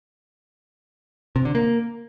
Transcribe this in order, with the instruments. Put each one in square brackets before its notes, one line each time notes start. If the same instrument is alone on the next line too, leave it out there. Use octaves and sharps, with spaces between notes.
[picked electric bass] C3
D3
A#3